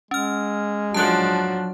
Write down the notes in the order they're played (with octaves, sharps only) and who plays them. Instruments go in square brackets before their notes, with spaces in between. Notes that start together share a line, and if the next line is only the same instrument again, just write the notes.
[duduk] G#3 [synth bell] C#4 F6
[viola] F3 D4 [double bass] F#3 [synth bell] A5 F#6